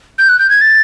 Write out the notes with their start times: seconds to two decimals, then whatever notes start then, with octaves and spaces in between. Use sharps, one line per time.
0.19 G6
0.29 F#6
0.39 G6
0.50 G#6
0.61 A6